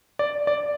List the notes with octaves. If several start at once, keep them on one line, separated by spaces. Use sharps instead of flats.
D5
D5